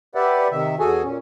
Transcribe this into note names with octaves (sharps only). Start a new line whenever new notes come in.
G4 B4 D5 E5 F#5
C3 D#3 E5
E2 F#4 G#4 A4 G#5
A#2 C#4